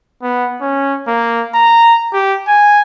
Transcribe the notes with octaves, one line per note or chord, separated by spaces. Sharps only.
B3
C#4
A#3
A#5
G4
G#5